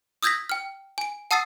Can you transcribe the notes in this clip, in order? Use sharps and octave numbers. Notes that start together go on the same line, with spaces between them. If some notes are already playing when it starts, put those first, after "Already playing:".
D#6 E6 G6 G#6 A#6 B6
G5 F6
G#5 D7
F#5 A5 D#6 E6 A6 C7